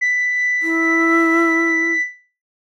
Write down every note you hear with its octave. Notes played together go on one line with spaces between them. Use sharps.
B6
E4